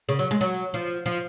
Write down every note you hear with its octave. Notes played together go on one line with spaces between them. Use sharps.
C#3
F#3
G#3
F#3
F3
F3